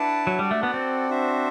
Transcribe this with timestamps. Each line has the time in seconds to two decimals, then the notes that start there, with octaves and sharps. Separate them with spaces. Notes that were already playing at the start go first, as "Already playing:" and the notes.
Already playing: D4 E4 B4 F#5 A5
0.27 F#3
0.39 G3 F#4 A4 D5 F#5
0.51 A3
0.63 B3
0.74 C4
1.09 D4 F#4 C5 E5